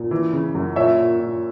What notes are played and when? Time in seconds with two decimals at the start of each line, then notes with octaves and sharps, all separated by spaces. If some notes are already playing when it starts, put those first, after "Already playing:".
Already playing: A#2
0.11 E3
0.33 C#3
0.55 F#2
0.76 A#2 C#5 E5
0.98 A#2
1.20 A#2